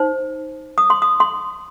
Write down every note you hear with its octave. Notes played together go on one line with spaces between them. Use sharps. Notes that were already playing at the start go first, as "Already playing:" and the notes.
Already playing: D#4 C5
D#6
C6
D#6
C6